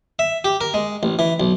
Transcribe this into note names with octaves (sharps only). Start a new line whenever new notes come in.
E5
G4
A#4
G#3
A1
E3
B1